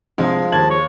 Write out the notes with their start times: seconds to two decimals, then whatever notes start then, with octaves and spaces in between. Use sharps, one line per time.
0.18 C2 G2 F3 G#3
0.52 D#2 A5 G#6 F#7
0.70 C#5